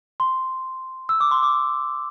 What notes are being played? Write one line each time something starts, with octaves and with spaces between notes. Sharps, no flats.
C6
E6
D6
C6
D6